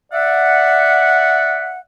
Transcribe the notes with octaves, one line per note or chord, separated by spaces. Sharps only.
D5 E5 F#5